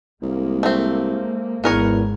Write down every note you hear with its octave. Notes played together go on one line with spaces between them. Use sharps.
C2 G#3 A#3
A3 C4
G#1 E2 G#2 B3 A#4 C#5